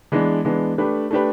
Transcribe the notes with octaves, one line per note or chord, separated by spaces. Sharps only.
E3 G#3 B3 D4
E3 G#3 B3 D4
A3 D4 G4 B4
A3 D4 G4 B4